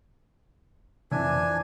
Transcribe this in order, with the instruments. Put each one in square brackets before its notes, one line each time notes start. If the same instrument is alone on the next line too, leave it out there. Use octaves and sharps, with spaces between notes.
[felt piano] F2 E3 [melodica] D4 G#5